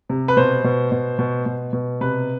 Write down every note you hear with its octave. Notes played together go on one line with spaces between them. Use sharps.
C3
B4
B2 C5
B2
B2
B2
B2
B2
C3 B4